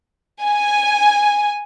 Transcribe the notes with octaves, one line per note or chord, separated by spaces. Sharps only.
G#5